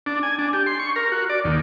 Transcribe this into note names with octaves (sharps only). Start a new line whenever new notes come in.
D4
G#5
D4
G4
C6
C#6
A#4
F#4
D5
D#2